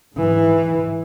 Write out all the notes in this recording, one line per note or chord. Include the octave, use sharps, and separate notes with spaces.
G#2 E3